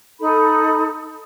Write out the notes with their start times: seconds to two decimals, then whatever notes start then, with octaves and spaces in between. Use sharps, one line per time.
0.20 D#4 A4 B5